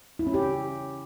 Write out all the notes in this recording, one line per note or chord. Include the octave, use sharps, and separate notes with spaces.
E4
C#4
G4